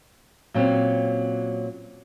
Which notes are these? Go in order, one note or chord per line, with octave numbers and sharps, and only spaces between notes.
A#2 F#3 C4 C#4